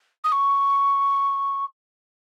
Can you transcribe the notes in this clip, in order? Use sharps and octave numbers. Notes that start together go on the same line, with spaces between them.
D#6
C#6